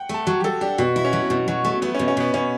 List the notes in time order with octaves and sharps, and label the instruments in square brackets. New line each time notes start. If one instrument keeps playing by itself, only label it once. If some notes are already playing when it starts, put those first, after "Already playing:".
Already playing: [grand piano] F#5 G5
[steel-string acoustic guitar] A3 [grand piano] A5
[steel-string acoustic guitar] F#3
[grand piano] G4
[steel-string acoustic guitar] F#3 [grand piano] A4
[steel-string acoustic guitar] D4 [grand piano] G4
[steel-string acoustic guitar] B2 [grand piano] F#4
[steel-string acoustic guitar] E4
[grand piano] C#4
[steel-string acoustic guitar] F#3
B2
F#3
A3
[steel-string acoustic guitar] A3 [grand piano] B3
[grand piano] C#4
[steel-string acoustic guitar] B2
[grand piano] C#4
[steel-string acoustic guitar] B2 [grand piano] B3
[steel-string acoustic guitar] B2 [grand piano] C#4